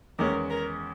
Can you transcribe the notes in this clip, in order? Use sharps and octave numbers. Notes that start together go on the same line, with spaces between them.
E2 D#3 G#3 C#4 A#4
A#4